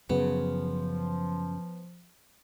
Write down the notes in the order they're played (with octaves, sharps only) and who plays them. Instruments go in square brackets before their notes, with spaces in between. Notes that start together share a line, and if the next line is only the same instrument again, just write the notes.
[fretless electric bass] F#2 C#3 [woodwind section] F3 [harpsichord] B3